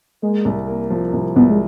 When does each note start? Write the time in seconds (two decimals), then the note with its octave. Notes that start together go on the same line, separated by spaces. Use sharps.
0.22 G#3 A#3
0.45 C2
0.67 A#3
0.90 F3
1.13 C2
1.36 C2 B3
1.50 G#3